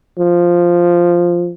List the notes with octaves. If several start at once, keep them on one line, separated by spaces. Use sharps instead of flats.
F3